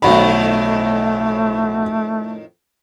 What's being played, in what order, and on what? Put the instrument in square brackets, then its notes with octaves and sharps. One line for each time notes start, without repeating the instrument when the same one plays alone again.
[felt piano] B1 F#4 B5 [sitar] F2 A2 D#3 [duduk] A3